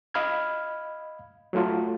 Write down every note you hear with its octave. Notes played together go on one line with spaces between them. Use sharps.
D#5 F5 B5 F6 G#6
F#3 A3 F4